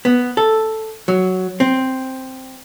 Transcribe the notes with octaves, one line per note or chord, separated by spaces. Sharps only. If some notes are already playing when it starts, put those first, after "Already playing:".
B3
A4
F#3
C4